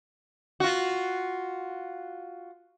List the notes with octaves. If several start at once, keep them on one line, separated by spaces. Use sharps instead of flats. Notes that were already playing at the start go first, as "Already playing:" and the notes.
F4 F#4